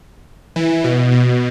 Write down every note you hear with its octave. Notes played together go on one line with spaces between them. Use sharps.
E3
B2
B2